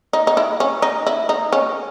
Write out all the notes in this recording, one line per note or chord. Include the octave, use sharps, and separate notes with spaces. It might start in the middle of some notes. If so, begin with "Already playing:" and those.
D#4
D#4
E4
C#4
D#4
E4
D#4
C#4